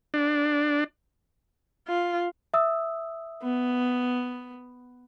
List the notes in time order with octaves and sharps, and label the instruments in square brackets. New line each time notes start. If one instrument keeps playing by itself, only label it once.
[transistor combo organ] D4
[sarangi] F4
[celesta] E5 D#6 E6
[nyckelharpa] B3